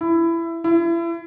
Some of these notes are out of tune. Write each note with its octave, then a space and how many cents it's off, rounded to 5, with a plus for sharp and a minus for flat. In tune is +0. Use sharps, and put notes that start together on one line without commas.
E4 +20
E4 +35